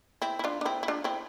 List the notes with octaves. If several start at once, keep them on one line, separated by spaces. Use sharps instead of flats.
C4 E4
E4
D4 F4
D4
C4 E4
E4
D4 F4
C4 E4